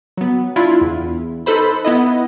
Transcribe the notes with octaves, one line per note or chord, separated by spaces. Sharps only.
F#3 B3
D4 E4 F4
E2
D#4 A4 B4 C5 B5
B3 E4 D#5